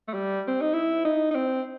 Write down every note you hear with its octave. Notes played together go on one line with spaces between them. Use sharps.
A3
G3
C4
D#4
E4
D#4
D#4
C4